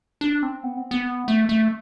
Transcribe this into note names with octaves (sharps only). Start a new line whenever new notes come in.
D4
C4
B3
C4
B3
A3
A3